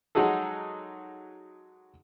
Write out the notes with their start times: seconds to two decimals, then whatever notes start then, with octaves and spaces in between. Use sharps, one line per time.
0.15 F#3 G#3 D#4 F#4 G#4 A4